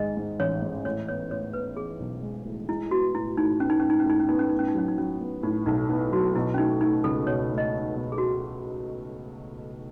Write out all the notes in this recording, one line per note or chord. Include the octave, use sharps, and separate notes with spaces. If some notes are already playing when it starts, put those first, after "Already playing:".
Already playing: G#2 D#3 G#3 D#5
G#2
A1 C#5
G#2
A2 C#5
B3 C#5
A2 C#5
B3 B4
B3 G#4
B1
G#3
A2
G#3 E4
B3 F#4
A2 E4
A2 D#4
B3 C#4
D#4
A2 C#4
D#4
C#4
A2 D#4
C#4
B3 D#4
C#4
A2 D#4
C#4
D#4
F#3 C#4
D#4
F#3 C#4
B3
A2 D#4
B1 D#4
B3 D#4
F#3 F#4
B2 E4
C#4
A3 D#4
A3 D#4
C#2 A4
B2 C#5
A3
D#5
D#4
B2
G#4
F#4